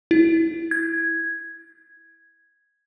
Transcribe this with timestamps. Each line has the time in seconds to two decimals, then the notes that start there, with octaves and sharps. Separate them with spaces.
0.11 E4
0.71 G#6